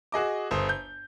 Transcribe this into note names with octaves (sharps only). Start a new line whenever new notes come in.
F#4 G#4 D#5 D6
G1 C5 D#6
G6